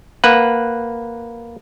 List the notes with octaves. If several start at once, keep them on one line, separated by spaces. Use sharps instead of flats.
A#3 B4 F#5